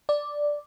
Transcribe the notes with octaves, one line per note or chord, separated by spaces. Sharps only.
D5